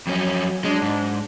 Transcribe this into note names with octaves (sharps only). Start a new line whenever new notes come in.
F2 F#3 C#4
G#3 D4
G#2